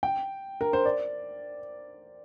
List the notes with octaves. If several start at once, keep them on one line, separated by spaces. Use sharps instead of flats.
G5
A#4
C5
D5